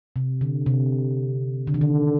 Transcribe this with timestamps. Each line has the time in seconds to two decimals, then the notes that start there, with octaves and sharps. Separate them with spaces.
0.16 C3
0.41 D3
0.66 C3
1.67 D3
1.74 D#3
1.81 D3